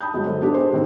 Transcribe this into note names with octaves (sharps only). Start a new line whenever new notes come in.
A5 B5 D#6 G6
G1 F#3 G#3
A4 C5 D#5
B3 D4 G4
G#4 C5
D2 D#3 C4